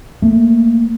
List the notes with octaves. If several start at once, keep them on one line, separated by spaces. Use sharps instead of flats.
A3 A#3